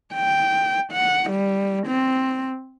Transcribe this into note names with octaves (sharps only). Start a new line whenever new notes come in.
G5
F#5
G3
C4